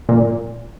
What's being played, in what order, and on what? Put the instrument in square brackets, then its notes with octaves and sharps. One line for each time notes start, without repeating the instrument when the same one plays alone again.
[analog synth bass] A#2